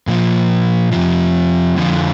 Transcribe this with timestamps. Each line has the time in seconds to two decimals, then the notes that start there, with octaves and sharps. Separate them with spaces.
0.07 A#2 F3 A#3
0.92 F2 C3 F3
1.76 F2 D3 F3